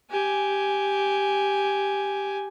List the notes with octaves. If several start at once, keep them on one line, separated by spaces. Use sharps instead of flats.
G4 G#5